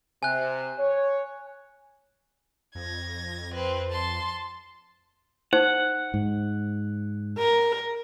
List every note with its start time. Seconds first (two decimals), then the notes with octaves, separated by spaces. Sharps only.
0.23 C3 G#5 F#6
0.78 C#5
2.75 F2 G#6 A#6
3.54 C4 B4
3.91 A5 C6
5.53 D#4 C5 F#5
6.14 G#2
7.38 A#4